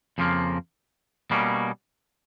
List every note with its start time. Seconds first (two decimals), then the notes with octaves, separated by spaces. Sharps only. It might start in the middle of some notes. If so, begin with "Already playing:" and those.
0.18 F2 C#3 F3 A#3
1.31 B2 G3 A#3 C#4